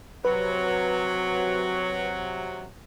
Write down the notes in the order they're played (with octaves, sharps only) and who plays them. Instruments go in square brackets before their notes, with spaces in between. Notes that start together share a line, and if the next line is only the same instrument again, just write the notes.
[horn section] C3 F#3 [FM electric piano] B4